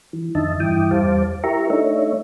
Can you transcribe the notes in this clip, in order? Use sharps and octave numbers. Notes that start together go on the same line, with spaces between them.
E3
F2 D3 D#3 D#5 E5 A5
G2 E3 E4 G5 D6 D#6
E2 G3 C5 F5 A5 D6
E4 G4 A#4 E5 A#5 C#6
A3 D4 D#4 C#5 E5